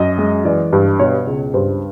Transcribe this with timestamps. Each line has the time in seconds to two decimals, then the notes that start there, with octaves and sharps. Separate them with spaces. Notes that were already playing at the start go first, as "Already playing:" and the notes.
Already playing: F#2 D#5
0.18 G#3
0.45 E3 D5
0.73 G2
0.99 B2 C#5
1.27 C#2
1.54 G2 C5